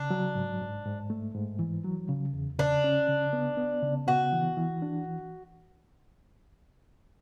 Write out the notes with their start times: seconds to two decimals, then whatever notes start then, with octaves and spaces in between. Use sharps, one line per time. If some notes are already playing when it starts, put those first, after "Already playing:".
Already playing: C#3 D4
0.11 F#3
0.35 G#2
0.61 G#2
0.85 G#2
1.10 A3
1.35 G#2
1.59 E3
1.84 F#3
2.09 C#3
2.34 E2
2.59 C#3 D4
2.84 C#4
3.08 C#3
3.33 B3
3.57 B3
3.83 C#3
4.07 B3 F#4
4.33 E3
4.57 E3
4.82 D4